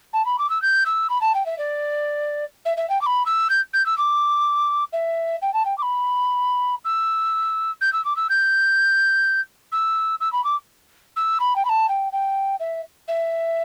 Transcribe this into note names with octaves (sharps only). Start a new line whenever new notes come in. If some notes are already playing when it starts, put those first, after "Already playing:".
A5
B5
D6
E6
G6
E6
B5
A5
G5
E5
D5
E5
E5
G5
D6
B5
E6
G6
G6
E6
D6
E5
G5
A5
G5
D6
B5
E6
G6
E6
D6
E6
G6
E6
E6
B5
D6
E6
B5
G5
B5
A5
G5
G5
E5
E5